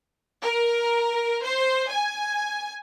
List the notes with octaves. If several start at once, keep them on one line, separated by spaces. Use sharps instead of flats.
A#4
C5
G#5